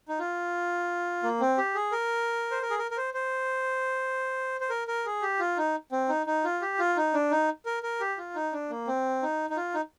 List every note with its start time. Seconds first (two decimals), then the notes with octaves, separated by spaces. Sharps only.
0.08 D#4
0.19 F4
1.23 A#3
1.40 C4
1.58 G4
1.75 G#4
1.92 A#4
2.51 C5
2.63 A#4
2.70 G#4
2.79 A#4
2.91 A#4
2.97 C5
3.14 C5
4.61 C5
4.70 A#4
4.88 A#4
5.06 G#4
5.22 G4
5.40 F4
5.57 D#4
5.92 C4
6.09 D#4
6.27 D#4
6.44 F4
6.62 G4
6.79 F4
6.97 D#4
7.14 D4
7.31 D#4
7.66 A#4
7.83 A#4
8.00 G4
8.18 F4
8.35 D#4
8.53 D4
8.70 A#3
8.87 C4
9.23 D#4
9.50 D#4
9.57 F4
9.74 D#4